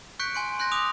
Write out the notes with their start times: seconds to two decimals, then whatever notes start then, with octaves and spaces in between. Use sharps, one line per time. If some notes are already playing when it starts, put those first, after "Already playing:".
0.19 C#6 F#6 G6 B6 C#7 D7
0.35 G#5 C6 D7
0.59 C6 F#6 G6 A#6
0.71 D6 D#6 F7